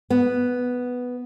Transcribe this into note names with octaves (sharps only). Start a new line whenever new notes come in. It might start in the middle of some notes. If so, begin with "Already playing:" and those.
B3